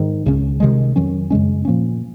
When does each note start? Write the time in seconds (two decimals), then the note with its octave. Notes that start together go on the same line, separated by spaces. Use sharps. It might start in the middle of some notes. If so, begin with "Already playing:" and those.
Already playing: G#2 D#3
0.26 C#2 C#3 G#3 C#4
0.60 C3 D#3 G#3
0.96 F2 D#3 F#3 C#4
1.30 F#2 C#3 G#3 C#4
1.65 A#2 F3 A#3 C#4